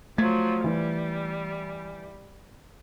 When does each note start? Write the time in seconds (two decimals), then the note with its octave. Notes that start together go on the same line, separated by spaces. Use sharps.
0.18 F3 F#3 A3 G#6
0.64 E3 G3